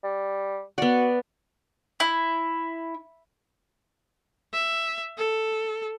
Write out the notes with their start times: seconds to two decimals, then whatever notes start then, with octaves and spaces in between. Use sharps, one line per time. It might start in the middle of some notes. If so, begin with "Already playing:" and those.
0.04 G3
0.78 B3 F#4 D5
2.00 E4
4.53 E5
5.18 A4